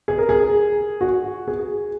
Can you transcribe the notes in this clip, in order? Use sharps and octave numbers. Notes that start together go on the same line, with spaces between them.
G#4
A#4
G#4
F#4
G#4